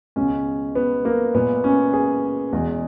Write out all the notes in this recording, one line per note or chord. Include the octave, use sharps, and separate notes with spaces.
C#2 B2 G#3 C#4
B3
A#3
A#2 G#3 B3
C#4
G#4
E2 B2 G#3